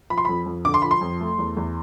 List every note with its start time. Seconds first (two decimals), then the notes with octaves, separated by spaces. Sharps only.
0.10 F3 B5
0.18 C6
0.25 F2 B5
0.46 F2
0.65 D3 D6
0.74 C6
0.82 F3 B5
0.91 C6
1.01 F2
1.21 A3
1.38 E2
1.57 E2